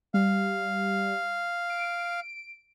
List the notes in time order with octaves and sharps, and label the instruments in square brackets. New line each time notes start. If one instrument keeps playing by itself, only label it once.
[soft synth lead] G3 [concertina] F5
[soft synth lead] D7